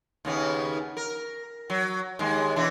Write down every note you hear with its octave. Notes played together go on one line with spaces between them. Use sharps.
D#2 C#3 B3
A#4
F#3
D#2 G#3
B2 E3 D4